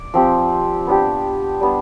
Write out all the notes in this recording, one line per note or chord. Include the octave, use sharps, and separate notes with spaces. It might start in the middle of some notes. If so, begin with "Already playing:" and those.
Already playing: D5
F3 C4 G4
B3 D4 G4
G3 B3 D4